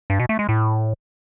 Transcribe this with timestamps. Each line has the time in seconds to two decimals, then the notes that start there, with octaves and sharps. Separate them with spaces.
0.10 G2
0.19 B2
0.29 A3
0.39 G#3
0.49 A2